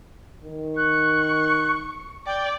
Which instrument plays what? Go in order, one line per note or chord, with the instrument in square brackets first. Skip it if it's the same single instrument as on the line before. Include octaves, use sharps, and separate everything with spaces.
[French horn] D#3
[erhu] C#6 [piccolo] F#6
[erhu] D5 [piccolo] G5